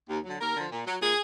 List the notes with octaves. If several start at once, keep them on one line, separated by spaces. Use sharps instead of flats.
D#2
D3 F#3
D#2 A#4
D3 F3
A#2
F#3
A#2 G#4